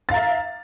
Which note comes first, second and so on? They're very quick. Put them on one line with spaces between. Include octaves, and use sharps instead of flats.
A6 F5 A#5 E5